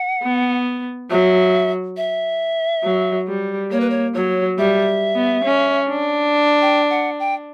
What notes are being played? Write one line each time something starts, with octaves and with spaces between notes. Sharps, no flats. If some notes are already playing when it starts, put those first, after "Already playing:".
Already playing: F#5
B3
F#3 E5
E5
F#3
G3
A#3 C#5
B4
C#5
F#3 C#5
G3 E5
B3
C#4
D4
G5
F#5
G5